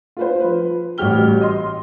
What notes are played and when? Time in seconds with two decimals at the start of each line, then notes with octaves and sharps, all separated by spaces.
0.17 F4 B4 C5
0.40 F3 B4
0.98 A1 G3 F#4 G4 F6 G7
1.41 D#5 C6